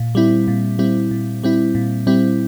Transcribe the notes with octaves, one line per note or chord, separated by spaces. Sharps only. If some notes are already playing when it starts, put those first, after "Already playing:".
Already playing: A#2
G3 C4 E4
A#2
G3 C4 E4
A#2
G3 C4 E4
A#2
G3 C4 E4